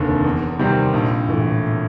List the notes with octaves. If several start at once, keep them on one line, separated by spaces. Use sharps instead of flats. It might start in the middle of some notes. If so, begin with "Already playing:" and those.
Already playing: F1 D#2 D3
E2
C3 D#3 G3 C4
A#1
A2 E3